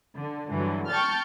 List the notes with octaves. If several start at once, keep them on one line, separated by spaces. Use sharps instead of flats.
D3
G2 D3 E3 F#3
G5 A5 C#6 F6 G6 A6